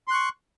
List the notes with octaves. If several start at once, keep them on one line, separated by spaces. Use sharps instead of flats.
C6 C#6 F#6